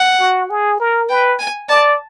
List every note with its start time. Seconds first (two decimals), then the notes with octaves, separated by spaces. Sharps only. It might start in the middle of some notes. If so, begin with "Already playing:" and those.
Already playing: F#5
0.20 F#4
0.50 G#4
0.80 A#4
1.10 B4 G5
1.40 G#5
1.69 D5 A5